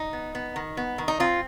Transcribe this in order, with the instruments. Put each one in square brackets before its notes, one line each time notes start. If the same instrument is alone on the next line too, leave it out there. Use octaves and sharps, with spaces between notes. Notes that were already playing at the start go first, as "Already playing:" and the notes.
Already playing: [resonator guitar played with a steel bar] D#4
B3
B3
D#3
B3
D#3
D#4
C4 F4